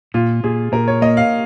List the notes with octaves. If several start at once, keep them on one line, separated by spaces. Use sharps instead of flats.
A#2 F4
A#2 G#4
A#2 A#4
C#5
A#3 D#5
F5